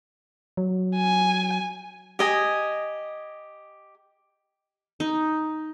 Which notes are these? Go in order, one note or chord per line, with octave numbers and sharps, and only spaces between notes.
F#3
G#5
G4 D#5 G#5
D#4